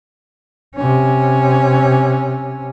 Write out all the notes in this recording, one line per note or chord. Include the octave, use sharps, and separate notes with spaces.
C3 C#4